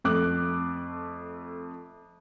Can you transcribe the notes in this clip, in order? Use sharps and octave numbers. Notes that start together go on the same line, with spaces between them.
F2 A3 D6 F#6